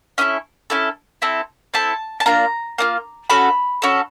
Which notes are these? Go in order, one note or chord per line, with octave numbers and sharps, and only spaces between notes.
C#4 E4 A4 D#5
C#4 E4 A4
C4 E4 A4
C4 E4 A4 A5
A5
A#3 D4 F4 A#5
A#3 D4 F4
C#4 F#4 A4 B5
C#4 F#4 A4